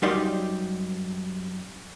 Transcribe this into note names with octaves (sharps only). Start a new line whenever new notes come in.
F#2 G3 D#4 G4 D5 C6